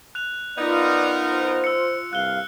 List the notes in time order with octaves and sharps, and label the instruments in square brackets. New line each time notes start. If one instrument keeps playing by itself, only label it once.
[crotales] F#6 F7
[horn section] B3 D#4 A#4 [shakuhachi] F4 [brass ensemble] B4 D5
[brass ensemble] C5
[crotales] E6 C#7
[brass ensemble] C2 G2 F5 [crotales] F#6 G7